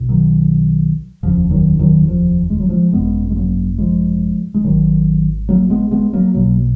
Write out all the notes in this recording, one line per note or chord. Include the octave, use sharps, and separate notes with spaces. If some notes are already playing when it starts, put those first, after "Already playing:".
Already playing: B1 B2
D#3 F#3
F1 D#2 C#3 F3
D#3 F#3
D#3 F#3
F3
G#3
F#3
F3 G#3
G#1 F#2 C#3 G#3 B3
G#3
F#3 A#3
F3 G#3
G#3
G#1 G#2 D#3 F#3
F#3 A#3
G#3 B3
G#3 B3
F#3 A#3
B1 B2 F#3 A#3